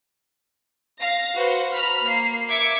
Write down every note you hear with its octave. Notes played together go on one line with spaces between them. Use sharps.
F5 A#6
F#4 B4 C5
A#5 B5 F6
A#3 C7
E5 D6 G#6 B6 C#7